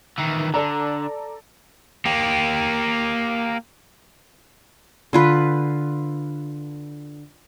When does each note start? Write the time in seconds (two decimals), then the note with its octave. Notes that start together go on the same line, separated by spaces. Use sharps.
0.18 D#3 E3
0.54 D3 A4 D5 A#5
2.05 A#3 G4
5.13 D3 F4 B4